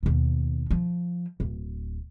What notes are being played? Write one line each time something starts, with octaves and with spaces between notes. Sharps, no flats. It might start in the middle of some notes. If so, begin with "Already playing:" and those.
D#2 B2
F3
D1